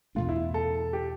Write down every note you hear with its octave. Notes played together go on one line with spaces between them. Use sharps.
E2 B2 A3 D4 F4
E4
A4
G4